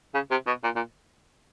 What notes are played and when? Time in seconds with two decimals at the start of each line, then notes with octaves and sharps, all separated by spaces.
0.14 C#3
0.31 C3
0.47 B2
0.64 A#2
0.76 A#2